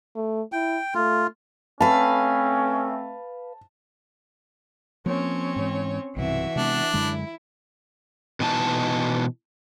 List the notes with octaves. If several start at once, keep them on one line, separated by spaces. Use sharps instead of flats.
A3
E4 G5
A3 F4
A3 C4 C#4 B4 F5 A5
F3 A#3 C4 C#4 C#5
G#2 E3
B1 G2 C3 E3 F#4 E5
C3 G#3 B3 D4
F#2 D3 G#3 E4
B2 E3 D#4 G#5 A5